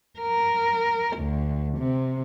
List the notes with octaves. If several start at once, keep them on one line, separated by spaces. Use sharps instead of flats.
A#4
D2
C3